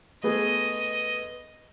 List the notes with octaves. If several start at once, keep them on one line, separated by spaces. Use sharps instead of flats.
A3 B3 G#4 D#5